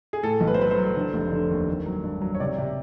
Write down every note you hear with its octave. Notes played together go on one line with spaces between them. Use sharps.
G#4
A2 A4
B1
B4
C5
F#3 B4
C5
F#3
D3
F1
D3
D#2
D#3
F#3
G2
F#3
C#5
C3 D5
C3